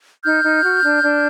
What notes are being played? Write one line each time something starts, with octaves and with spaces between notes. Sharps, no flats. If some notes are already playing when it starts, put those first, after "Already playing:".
D#4 F6 G6
D#4
F#4
D4
D4